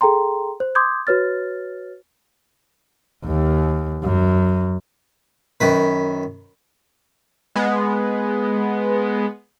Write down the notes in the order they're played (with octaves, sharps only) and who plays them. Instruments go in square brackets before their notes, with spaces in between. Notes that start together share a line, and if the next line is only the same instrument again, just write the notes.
[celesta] G#4 A4 G5 A#5 C6
C5
C6 D6 D#6 G6 G#6
F#4 B4 C#5 F6 A6
[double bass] D#2
F#2
[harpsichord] F#2 D#3 B4
[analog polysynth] G#3 B3